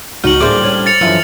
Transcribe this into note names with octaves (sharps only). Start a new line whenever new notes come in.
C#2 D#4 F#4 F6 F#7
A2 G3 A#3 D4 G#4 C5 D5 D6
C#4
A6 C#7 F7
F#2 D3 E3 F3 F4